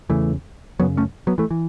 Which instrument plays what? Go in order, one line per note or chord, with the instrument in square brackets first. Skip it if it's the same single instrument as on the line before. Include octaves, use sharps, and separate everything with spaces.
[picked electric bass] E2 C#3 E3 A3
F#2 C#3 F#3 B3
A3 C#4
F#3 B3
E3 A3
E3